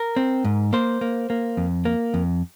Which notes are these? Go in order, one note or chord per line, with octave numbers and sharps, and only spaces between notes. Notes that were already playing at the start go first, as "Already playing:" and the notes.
Already playing: A#4
C4
G#2
A#3 C5
A#3
A#3
F2
A#3
F2